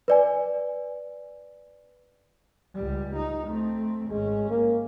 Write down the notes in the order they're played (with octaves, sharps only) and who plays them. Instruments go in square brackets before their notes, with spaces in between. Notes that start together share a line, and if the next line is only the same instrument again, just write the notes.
[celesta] B4 D5 G#5
[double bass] C#2 G3
D#4
A3 C4
[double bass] G#1 C#4 [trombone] G#3
[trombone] A#3